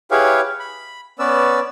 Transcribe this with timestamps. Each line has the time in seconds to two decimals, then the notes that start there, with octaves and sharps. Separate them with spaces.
0.11 E4 G4 G#4 B4 C#5 F5
0.59 B5
1.19 B3 C#4 B4 D5 E6